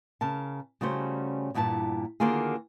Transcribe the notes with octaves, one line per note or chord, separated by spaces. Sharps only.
C#3 A#4 A5
C#3 G3 A3 C#4 F#4 C5
E2 G2 A#2 G#5 A5
D3 D#3 A#3 F4 F#4 G#4